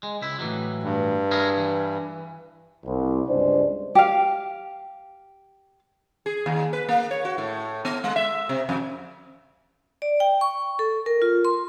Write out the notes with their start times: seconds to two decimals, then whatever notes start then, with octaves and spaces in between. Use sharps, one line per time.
0.03 G#3
0.22 C#2 E4
0.39 A2 E3 F#3
0.83 G2
1.31 E4 G#4 A#4
1.58 E3
2.86 C2
3.28 C#2 G2 G#3 D4 C5 D5
3.95 G4 F5
6.26 G#4
6.46 D#2
6.73 B4
6.89 A#3
7.11 C#5
7.25 F#4
7.38 A2
7.85 B3
8.04 G#3
8.16 E5
8.49 C3
8.69 F2
10.02 D5
10.20 G5
10.41 C#6
10.79 A4
11.06 A#4
11.22 F4
11.45 C6